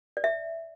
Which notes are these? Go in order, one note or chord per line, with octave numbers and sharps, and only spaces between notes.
D5
E5